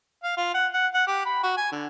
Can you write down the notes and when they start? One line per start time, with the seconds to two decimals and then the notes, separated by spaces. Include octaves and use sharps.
0.23 F5
0.37 F4
0.54 F#5
0.74 F#5
0.94 F#5
1.07 G4
1.26 B5
1.43 F#4
1.57 G#5
1.72 D3